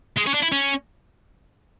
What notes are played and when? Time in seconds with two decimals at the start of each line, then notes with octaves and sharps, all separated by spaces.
0.17 G#3
0.26 C#4
0.34 D4
0.42 E4
0.52 C#4